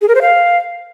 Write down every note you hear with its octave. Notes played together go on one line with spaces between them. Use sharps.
G#4
A#4
C5
F5